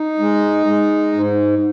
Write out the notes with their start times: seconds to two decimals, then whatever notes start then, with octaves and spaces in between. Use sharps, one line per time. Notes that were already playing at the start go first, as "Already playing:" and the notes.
Already playing: D#4
0.19 G#3
0.66 G#3
1.13 G#2